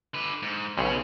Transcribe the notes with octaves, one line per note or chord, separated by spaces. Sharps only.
D3 B4
G#2
B1 C#3 C#4